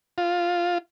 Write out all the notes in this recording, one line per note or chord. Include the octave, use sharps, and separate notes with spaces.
F4